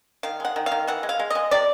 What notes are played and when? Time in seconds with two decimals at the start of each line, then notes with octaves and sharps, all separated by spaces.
0.23 D#3 F5
0.40 G#3 F#5
0.56 D#3
0.66 F5
0.71 D#3
0.87 E3 F#5
1.03 G#3
1.09 F5
1.19 G#3
1.30 G#3 D#5
1.51 C3 D5